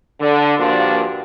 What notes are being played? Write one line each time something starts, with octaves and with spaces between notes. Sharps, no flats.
D3
G2 A#2 F3 A#3 D4 F#4